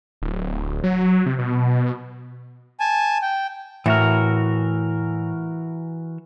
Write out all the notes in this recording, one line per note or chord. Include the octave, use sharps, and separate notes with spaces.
D1
F#3
C3
B2
G#5 A5
G5
A2 E3 F#4 A#4